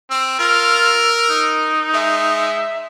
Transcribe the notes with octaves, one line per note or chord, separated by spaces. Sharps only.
C4 E6
F4 A#4
D#4
G#3 E5